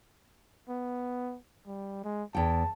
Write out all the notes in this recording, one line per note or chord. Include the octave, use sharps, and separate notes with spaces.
B3
G3
G#3
E2 G5 A5